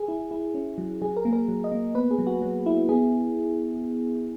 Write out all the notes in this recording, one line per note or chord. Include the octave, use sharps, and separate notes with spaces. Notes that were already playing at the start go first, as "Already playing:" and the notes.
Already playing: G#4
E4
E4
C#4
F#3
F#3 G#4
A#4
A#3
A#4
F#3
D#5
A#3
B3 B4
G#4
F#3
F#4
F#3
E4
B3 G#4